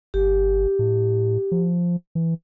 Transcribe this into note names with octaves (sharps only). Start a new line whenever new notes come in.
G1 G4
A2
F3
E3